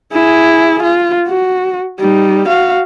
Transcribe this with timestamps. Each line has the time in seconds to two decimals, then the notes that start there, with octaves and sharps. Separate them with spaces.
0.12 E4 G#4
0.83 F4
1.29 F#4
1.99 G3 D#4
2.48 F#4 F5